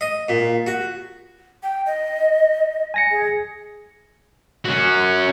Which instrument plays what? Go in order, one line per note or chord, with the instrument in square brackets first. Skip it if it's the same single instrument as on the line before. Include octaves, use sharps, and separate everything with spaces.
[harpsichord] D#5
A#2
F#4
[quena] G5
D#5
[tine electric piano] G#5 A#6 C#7
[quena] G#4
[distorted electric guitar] C#4 F#4